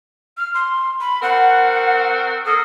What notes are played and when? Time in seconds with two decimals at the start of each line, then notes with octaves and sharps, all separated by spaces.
0.38 F6
0.54 C6
1.01 B5
1.22 C4 F#4 A#4 F#5
2.46 A#3 A4 D#6